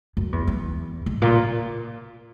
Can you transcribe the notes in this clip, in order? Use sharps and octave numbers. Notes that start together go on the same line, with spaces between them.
F#2
E2
E2
G#2
A#2